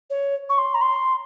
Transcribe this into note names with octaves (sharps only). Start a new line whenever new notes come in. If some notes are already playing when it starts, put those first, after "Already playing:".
C#5
C#6
C6
A#5
C6